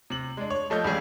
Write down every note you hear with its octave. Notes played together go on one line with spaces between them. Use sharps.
C3 F#7
G#3 D4
C#5
F3 A3 D#5 G6
C#2 C#3 E3 G3 G#4